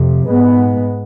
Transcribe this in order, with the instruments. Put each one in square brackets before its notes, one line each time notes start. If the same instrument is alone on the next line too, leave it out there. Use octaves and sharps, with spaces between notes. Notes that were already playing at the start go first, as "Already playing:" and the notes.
Already playing: [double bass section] F2 C3
G#2 G#3 B3